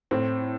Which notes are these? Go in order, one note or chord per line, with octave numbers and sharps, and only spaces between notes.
A2 C4